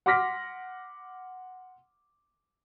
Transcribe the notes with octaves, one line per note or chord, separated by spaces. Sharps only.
F#5 C6 D6 F6 A#6 B6